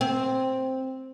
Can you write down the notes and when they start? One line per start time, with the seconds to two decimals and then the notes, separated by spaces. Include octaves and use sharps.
0.01 C4